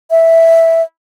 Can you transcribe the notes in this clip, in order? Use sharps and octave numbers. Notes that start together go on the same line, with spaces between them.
E5